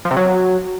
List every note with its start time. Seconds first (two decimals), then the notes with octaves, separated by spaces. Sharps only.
0.05 F3
0.11 C3
0.17 F#3